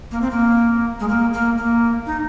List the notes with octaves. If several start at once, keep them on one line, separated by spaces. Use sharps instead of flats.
A#3
C4
A#3
G#3
A#3
A#3
A#3
D#4